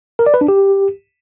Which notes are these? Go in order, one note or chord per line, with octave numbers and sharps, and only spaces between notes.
A#4
D5
B4
D4
G4